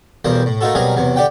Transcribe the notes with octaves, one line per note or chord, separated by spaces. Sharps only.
B1 E2 G3 A#3 C5
A2
A3 A#3 D#4 F4 F#4 A4
B2 F#3 G3 C4 G#4 A#4
E2 C3 F#3
D3 D4 G4 F#5 G5